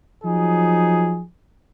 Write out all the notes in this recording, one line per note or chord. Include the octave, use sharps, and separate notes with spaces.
F3 F#3 D#4 G#4